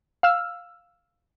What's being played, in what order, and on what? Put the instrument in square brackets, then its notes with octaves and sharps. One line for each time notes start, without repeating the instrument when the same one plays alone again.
[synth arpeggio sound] F5 E6 F6